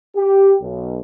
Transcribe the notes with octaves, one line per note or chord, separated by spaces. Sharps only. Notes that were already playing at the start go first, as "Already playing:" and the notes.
G4
B1